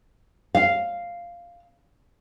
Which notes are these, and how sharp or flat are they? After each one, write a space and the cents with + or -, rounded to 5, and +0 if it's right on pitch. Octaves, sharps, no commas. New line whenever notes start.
F5 -5